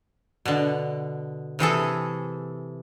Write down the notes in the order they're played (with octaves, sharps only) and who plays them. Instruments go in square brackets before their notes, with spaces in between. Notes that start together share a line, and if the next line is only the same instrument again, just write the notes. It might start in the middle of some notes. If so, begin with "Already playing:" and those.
[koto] B2 D3
C3 E3 G#4 A4